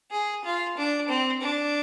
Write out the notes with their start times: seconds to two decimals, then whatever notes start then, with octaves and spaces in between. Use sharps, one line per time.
0.11 G#4
0.44 F4
0.77 D4
1.08 C4
1.41 D4